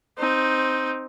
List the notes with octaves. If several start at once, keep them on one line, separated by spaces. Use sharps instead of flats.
C4 D#4